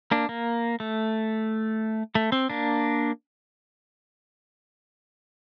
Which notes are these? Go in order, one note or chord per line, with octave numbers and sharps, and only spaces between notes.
A#3 D4
A#3
A3
A3
C4
A#3 D4